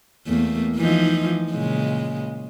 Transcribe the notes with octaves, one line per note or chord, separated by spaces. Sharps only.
E2 A3 A#3
E3 F3 D#4
A#2 C#3 G#3